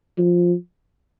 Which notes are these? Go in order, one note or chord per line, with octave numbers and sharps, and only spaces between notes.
F3